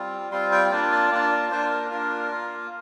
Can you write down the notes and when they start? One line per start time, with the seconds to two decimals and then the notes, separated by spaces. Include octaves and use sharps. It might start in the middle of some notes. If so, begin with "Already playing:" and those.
Already playing: G3 C4 F4
0.31 G3 C4 F4 C6
0.52 G5
0.71 A#3 D4 F4 D5
0.92 D5
1.11 A#3 D4 F4 D5
1.32 D5
1.51 A#3 D4 F4 C5
1.71 A#4
1.91 A#3 D4 F4 A#4
2.31 A#3 F4